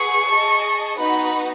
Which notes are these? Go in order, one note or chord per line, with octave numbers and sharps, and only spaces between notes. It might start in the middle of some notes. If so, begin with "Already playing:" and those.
Already playing: G#4 B4 F#5 C#6
G#4 D#5 A5
B3 D#4 F#4 B4 F#5 B5